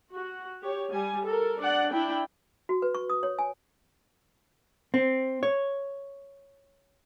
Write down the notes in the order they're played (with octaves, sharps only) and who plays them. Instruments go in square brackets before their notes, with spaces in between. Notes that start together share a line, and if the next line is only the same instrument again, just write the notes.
[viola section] F#4
G4 C#5
G3 G#5
A4 A#4
D4 D5 F#5
D4 E4 G5
[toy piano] F#4
B4
C#6
D#6
C#5
G#5
[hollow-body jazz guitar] C4
C#5